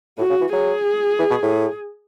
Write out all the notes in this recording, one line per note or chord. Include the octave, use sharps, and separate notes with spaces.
A2 F#4
C#3
E3
F#3 G#4
E3
B2
A2